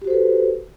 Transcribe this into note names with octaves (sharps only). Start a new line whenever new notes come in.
F#4 G4 A4 B4 C5